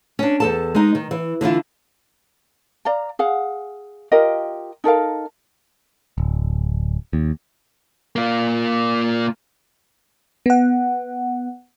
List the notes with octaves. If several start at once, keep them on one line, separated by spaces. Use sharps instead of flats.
C#4 D4
E2 A4 A5
G#3 D#4
D#3
E3
D3 E3 E4 F4
D5 F5 A#5
G#4 F5 F#5
F4 G4 A#4 D#5
D#4 A4 A#4 F5
D1
D#2
A#3 F4
B3 F#5